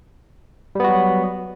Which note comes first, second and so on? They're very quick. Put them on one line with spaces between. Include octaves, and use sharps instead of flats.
G3 B3 F#4 F#3